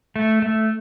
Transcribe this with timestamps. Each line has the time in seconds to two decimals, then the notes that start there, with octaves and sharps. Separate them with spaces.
0.16 A3
0.42 A3